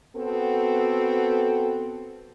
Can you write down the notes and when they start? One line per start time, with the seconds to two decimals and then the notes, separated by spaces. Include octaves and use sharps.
0.16 B3 C4 F#4 A4